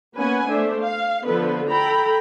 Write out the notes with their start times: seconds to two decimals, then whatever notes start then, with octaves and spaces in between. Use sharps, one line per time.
0.16 A#3 B3 C#4 B4 F#5 G#5
0.50 A3 D4 C5 E5
0.80 F5
1.25 D3 F3 B3 A4 B4
1.70 A4 G5 A#5 B5